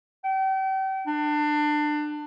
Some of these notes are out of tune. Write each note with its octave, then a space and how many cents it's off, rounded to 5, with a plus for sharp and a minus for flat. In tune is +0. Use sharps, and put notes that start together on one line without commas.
G5 -40
D4 +25